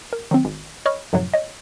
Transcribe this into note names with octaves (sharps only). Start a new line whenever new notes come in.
A#4
D#3 F#3 C4
G#1
C#5 D#5 B5 C#6 F6
F#2 A2 C3 F3 F#3
C#5 D#5